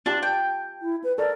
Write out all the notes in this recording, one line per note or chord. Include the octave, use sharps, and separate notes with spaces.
D4 F4 G4 A5
G5
E4
B4
A4 A#4 D5